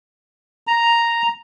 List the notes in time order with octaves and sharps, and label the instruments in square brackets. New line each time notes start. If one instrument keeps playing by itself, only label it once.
[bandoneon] A#5